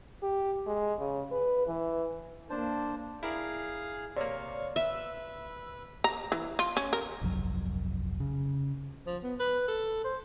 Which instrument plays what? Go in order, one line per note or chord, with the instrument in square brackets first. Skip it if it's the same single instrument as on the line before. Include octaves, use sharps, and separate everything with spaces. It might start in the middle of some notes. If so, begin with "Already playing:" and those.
[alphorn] G4
G#3
C#3
B4
E3
[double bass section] A#3 [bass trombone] D4 [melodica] C5 A5
[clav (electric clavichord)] E4 A#4 D5 [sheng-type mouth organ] G#4 F5
[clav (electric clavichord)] C3 A#3 [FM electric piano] C#5 D5 [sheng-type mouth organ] F5 C#6
[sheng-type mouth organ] B4 [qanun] E5 [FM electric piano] E6
[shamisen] A#5
E3
F4
C#4
A#4
[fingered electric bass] G1 C2 F2 F#3
C#3
[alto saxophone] F3
B3
B4
A4
C5